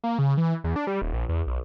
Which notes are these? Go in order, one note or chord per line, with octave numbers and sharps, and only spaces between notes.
A#3
C#3
E3
E2
D4
G3
D#1
A#1
E2
B1